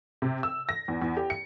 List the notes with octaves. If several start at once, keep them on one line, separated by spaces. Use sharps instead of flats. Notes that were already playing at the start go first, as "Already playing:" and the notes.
C3
E6
A#6
E2
E2
G4
C#7